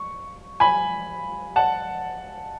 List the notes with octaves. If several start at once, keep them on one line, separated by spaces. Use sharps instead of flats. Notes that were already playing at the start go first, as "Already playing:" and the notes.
Already playing: C#6
G#5 B5
F#5 A5